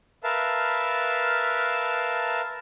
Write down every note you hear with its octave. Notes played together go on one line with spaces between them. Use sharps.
A#4 B4 E5 F5 A5